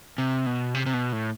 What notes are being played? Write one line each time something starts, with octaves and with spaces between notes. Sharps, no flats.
C3
B2
C3
C3
B2
A2